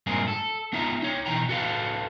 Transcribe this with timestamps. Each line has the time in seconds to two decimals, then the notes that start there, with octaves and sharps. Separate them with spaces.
0.07 G2 A#2 G#3 C4 G#4 A#4
0.28 A4
0.73 B3 D#4 F4 E5 A#5
1.02 D#4 C#5
1.26 B2 E3 G5 A#5
1.49 F#4 A4 B4 F5